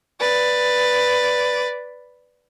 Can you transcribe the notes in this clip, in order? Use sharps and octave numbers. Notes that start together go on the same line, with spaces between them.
B4 D5